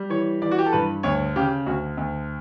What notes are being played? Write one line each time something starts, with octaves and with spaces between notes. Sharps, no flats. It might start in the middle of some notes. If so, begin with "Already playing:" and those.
Already playing: G3
E3 C#5
E3 D5
F#4
G4
A4
G2 B4
D2 C#5
C#3 G4
D2 F#4
D2